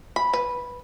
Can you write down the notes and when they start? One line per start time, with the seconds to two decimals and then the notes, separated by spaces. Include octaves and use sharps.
0.16 B5
0.33 B4